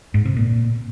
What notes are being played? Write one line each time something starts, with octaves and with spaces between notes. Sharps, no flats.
G#2
C3
A#2